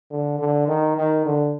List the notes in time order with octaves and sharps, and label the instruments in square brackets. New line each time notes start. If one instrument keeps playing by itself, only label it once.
[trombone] D3
D3
D#3
D#3
D3